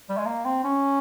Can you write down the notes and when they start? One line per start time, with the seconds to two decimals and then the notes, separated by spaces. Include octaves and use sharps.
0.09 G3
0.17 G#3
0.26 A#3
0.45 C4
0.64 C#4